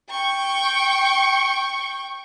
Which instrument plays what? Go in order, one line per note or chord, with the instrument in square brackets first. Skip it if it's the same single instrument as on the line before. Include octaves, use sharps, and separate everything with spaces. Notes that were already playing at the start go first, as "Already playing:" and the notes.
[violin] G5 C#6